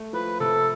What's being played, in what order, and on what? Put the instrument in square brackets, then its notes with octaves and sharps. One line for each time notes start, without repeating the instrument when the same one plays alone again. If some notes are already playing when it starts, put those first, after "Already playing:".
Already playing: [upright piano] A3
[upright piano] F3 [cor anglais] B4
[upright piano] C3 [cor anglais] A4